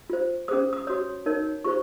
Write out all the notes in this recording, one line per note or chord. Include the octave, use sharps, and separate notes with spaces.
F4 C5
C#4 G#4 C5 D#6
D#6
F#4 C#5 D#6
D#4 A#4 C#5
F4 G#4 C5 C#6